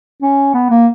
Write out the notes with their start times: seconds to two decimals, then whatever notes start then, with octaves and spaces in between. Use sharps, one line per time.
0.22 C#4
0.54 B3
0.70 A#3